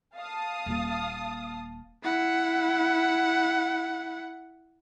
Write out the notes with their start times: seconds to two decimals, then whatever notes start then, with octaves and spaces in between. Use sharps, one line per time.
0.15 F5 A5 D#6
0.66 D#1 A#3
2.03 E4 F#5